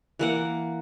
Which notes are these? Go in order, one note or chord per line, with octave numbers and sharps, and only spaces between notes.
E3 A#3 F#5